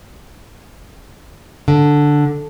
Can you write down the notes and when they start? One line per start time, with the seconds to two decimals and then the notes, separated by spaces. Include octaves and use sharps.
1.68 D3